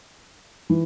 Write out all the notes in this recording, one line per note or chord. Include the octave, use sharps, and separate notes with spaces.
E3